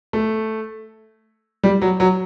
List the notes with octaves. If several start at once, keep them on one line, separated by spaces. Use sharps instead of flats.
A3
G3
F#3
F#3